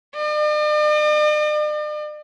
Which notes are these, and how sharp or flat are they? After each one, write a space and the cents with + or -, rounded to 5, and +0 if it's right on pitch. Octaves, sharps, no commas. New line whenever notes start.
D5 +45